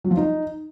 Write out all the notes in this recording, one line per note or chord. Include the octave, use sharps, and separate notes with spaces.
F#3
F3
D#4